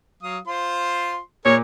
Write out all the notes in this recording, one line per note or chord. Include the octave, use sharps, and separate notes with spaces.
F#3 F5 D#6
F4 C5 C6
A#2 G#4 A#4 C#5